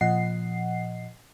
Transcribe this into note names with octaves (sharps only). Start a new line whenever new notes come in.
A#2 F3 D#5 F#5 C7